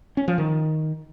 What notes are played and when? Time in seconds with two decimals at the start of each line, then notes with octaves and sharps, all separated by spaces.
0.17 C#4
0.28 F3
0.38 D#3